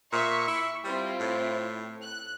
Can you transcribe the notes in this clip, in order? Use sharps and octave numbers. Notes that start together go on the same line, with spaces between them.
A#2 E5 C#6
E4
G3 C4 E4 F4
A2
F#6